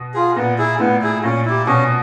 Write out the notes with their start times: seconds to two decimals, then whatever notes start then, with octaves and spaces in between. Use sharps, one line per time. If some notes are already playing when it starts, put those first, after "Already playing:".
Already playing: B2
0.14 F4 G#4
0.36 A#2 B3
0.58 E4 G#4
0.79 A2 B3
1.02 E4 G#4
1.24 A#2 C#4
1.45 E4 G4
1.66 B2 C#4